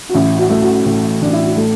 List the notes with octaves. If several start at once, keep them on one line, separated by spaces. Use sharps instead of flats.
F#4
A1 E4
F#4
A3
F#4
A2 A4
A1 D4
E4
F#4
A3 A4